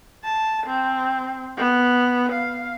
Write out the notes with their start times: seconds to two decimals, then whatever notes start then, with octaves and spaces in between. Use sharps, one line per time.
0.24 A5
0.67 C4
1.57 B3
2.32 F5